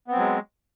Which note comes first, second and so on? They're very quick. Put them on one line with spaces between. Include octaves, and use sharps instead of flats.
B3 C4 F#3 G#3